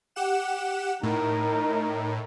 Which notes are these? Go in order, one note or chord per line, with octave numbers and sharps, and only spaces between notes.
G4 F#5 E7
A2 D#4 A#4